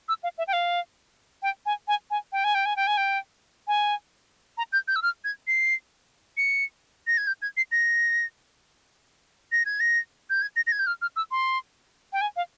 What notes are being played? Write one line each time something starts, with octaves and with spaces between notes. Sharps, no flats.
E6
F5
E5
G5
F5
G5
G#5
G#5
G#5
G5
G#5
G5
G#5
G5
G#5
G5
G#5
A#5
G6
G6
E6
F6
G#6
C7
C#7
A#6
G#6
G6
G#6
C7
A#6
A#6
G#6
A#6
G6
G#6
A#6
A#6
G#6
G6
F6
F6
E6
C6
G5
G#5
F5